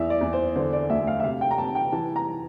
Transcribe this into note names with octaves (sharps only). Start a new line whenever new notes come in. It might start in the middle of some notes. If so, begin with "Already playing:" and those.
Already playing: E2 E5
D5
E2
C5
D3 C5
D5
D2 E5
F5
E5
C3 F5
G5
A#5
C3 A5
G5
E3 A5
A#5